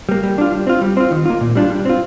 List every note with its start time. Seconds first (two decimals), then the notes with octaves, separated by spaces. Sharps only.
0.09 G3 A#3
0.23 G3
0.38 D4 F4
0.52 G3
0.67 C4 F4
0.81 G3
0.97 C4 F4
1.11 D#3
1.26 A#3 F4
1.41 A#2
1.55 G3 D4 F4
1.70 G3
1.85 C4 F4